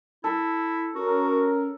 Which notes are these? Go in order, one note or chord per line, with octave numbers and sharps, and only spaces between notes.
E4 A4
C#4 F#4 A#4